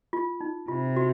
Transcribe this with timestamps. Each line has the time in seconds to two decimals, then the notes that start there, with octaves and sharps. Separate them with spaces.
0.13 F4
0.41 D#4
0.68 C3 F4
0.97 F#4